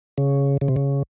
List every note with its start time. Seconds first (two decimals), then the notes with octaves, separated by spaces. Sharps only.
0.18 C#3
0.61 C#3
0.68 C3
0.76 C#3